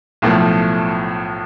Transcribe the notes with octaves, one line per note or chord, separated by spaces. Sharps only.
B1 A2 F3 A3